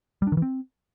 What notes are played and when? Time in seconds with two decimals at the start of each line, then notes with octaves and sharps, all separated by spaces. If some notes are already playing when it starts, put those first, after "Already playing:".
0.22 G3
0.27 D4
0.32 D#3
0.37 E3
0.42 C4